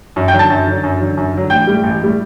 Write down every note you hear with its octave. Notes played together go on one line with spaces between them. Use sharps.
F#2
G5 G6
D3 F#3
A5 A6
F#2
D3 F#3
F#2
D3 F#3
F#2
D3 F#3
A1 G5 G6
A2 G3
A1
A2 G3